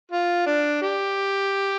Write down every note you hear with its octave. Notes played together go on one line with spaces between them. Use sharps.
F4
D4
G4